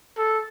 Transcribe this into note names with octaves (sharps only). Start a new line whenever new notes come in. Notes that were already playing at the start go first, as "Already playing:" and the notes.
A4